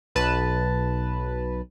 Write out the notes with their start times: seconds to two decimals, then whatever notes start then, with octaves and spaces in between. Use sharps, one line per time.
0.15 B1 B4 A5